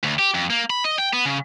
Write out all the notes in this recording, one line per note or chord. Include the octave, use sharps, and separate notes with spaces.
D2
G4
F2
A#3
B5
D#5
G5
B3
C#3